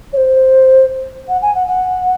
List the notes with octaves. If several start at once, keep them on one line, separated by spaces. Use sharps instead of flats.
C#5
C5
F#5
G#5
F#5
F#5